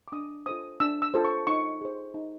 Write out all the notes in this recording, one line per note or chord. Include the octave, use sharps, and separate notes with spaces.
D6
D4 D#6
F4 A4 C5 D#6
D4 E6
E6
F4 A4 C5
C#6
D#4 C#6
G#4 C5
D#4